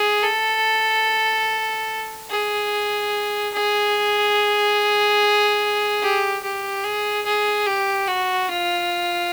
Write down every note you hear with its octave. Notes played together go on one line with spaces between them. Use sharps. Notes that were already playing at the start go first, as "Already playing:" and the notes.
Already playing: G#4
A4
G#4
G#4
G4
G4
G#4
G#4
G4
F#4
F4